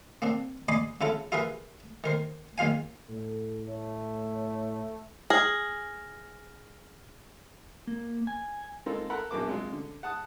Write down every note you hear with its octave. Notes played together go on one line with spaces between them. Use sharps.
A#3 C4 D4
D5 D#5 G#5 B5 C6 D6
C#3 E4 F4 A4
E4 F4 G#4 A#4 B4
D#3 A#4 C5
A#1 D#3 F4 F5 G#5
A2 A4
A3 C#5
G#4 F6 A#6 F#7
A#3
G#5
G#3 A#3 C4 D#4 F4 A4
A4 A#4 F#5 B5 C6
A#1 E2 F#3 A#3 A5 D6
C3 F#3 G#3 F4
D3
F#5 A5 D#6